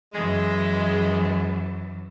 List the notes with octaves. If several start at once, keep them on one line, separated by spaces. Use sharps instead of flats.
F#2 E3 G#3